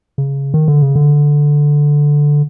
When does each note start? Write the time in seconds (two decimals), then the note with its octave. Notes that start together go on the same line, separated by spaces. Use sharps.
0.18 C#3
0.54 D#3
0.68 D3
0.82 C#3
0.95 D3